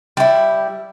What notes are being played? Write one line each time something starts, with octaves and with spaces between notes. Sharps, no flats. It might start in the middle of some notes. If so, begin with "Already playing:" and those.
G3 E4